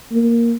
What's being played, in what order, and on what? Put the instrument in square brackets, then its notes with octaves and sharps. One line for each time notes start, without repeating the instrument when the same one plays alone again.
[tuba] A#3